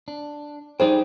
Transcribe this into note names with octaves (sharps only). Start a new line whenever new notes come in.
D4
G3 D#4 G#4 C5 G5